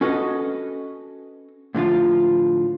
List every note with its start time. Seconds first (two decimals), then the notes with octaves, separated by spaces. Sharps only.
0.01 C#4 F#4 A4 B4 D#5
1.75 A2 D3 F3 F4